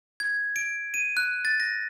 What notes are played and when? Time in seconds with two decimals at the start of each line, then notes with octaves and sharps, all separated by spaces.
0.20 G#6
0.56 D7
0.94 D#7
1.17 F#6
1.45 A6
1.60 A#6